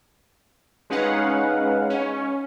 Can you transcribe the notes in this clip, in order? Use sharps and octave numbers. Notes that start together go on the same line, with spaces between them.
G#3 C#4 D#4 B4 F5 F#5
C#4